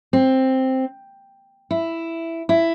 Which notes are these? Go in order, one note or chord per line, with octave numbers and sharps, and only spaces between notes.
C4
E4
E4